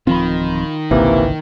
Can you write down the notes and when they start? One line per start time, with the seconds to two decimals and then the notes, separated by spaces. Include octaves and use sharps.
0.07 D1 D#3 F3 C4 F4 B5
0.91 G#1 C#2 C3 E3 A#3